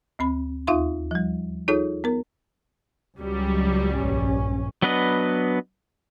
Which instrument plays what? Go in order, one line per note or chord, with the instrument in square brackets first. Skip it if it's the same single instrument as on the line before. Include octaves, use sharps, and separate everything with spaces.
[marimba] D2 C4 B5
D#2 D#4 F4 E5 F5 C6
F3 G3
D#4 F4 G#4 A4 C#5
B3 A#4
[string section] C#2 F#3 G3
[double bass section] A#1 G2 C#4
[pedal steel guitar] F#3 B3 D4 B4 D#5